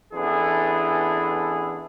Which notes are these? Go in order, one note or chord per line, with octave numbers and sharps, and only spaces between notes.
A1 E3 B3 D4 G#4 A4